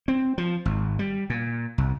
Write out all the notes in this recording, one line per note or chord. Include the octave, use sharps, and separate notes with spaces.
C4
F3
G#1
G3
A#2
C2